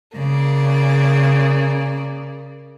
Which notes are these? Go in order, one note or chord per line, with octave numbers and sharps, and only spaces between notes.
C#3 A#3 D5